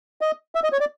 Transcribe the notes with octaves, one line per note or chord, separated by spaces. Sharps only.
D#5
E5
D#5
C#5
D5